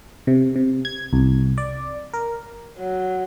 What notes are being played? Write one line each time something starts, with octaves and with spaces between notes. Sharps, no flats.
C3
C3
G#6
C2
D5
A#4
F#3